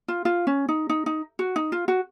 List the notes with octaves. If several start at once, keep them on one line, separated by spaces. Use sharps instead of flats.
F4
F4
C#4
D#4
D#4
D#4
F#4
D#4
F4
F#4